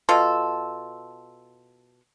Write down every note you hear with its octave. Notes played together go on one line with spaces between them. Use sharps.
B2 F4 A4